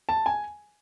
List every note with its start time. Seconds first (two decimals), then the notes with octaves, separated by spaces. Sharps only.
0.09 A5
0.26 G#5